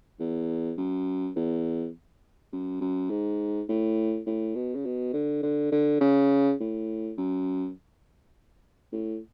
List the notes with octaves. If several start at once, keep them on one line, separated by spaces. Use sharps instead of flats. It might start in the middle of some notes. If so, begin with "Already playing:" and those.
E2
F#2
E2
F#2
F#2
G#2
A2
A2
B2
C#3
B2
D3
D3
D3
C#3
A2
F#2
A2